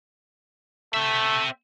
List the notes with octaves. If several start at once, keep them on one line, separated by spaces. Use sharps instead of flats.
A3 C4 E5